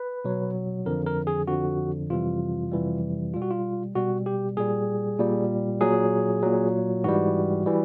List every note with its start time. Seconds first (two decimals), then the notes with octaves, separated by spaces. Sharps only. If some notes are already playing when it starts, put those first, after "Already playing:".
Already playing: B4
0.25 B2 F#3
0.86 F2 D3 F3 A#4
1.06 A#4
1.27 G#4
1.47 F2 D3 F3 F#4
2.10 F2 C3 E3 G3 F4
2.72 F2 C3 E3 G3
3.33 B2 G3 F4
3.42 F#4
3.51 F4
3.95 B2 G3 F#4
4.26 G4
4.57 A#2 G3 G#4
5.19 A#2 G3
5.81 A#2 F#3 G#4
6.42 A#2 F#3
7.04 G#2 E3 G3 F#4
7.66 E3 G3